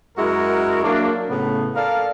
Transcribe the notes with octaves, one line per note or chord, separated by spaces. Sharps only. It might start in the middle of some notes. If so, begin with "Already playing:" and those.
F#2 G#3 E4 F#4 A#4
F#3 A#3 D4
A2 C#3 B3
A4 A#4 D5 F5